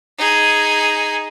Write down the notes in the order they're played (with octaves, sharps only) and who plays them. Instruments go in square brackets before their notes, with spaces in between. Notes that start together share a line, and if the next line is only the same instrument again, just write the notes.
[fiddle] D#4 G#4